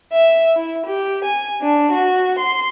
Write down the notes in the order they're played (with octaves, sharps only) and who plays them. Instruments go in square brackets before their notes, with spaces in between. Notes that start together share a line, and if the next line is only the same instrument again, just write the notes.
[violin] E5
E4
G4
G#5
D4
F#4
C6